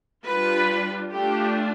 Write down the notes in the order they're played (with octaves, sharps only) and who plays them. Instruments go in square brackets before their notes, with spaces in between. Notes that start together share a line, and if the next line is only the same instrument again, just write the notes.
[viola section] G3 D4 F4 B4
A3 D4 F4 G4